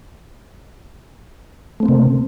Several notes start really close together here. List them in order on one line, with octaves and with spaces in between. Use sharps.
A3 C4 A#3 C3